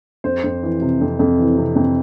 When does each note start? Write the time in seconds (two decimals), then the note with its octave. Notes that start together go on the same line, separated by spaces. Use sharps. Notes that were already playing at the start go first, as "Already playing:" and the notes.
0.24 F2 C5
0.44 F2
0.63 E3
0.82 C3
1.01 F2
1.19 F2
1.39 E3
1.57 C3
1.76 F2